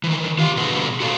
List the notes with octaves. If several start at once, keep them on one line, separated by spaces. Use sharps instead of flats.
D#3 E3
F4 G4 F5
B2 D3 F3 F#4 G#4 B4
F#4 G#4 A4 D5 F5